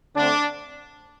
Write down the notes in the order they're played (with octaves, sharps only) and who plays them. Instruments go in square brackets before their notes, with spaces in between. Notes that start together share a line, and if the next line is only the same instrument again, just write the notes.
[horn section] D3 A3 C4 D4